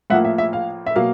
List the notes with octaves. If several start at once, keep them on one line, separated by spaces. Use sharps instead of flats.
A2 F3 A#3 E5 F#5
E5
E5
F5
E5
B2 F#3 A#3 F5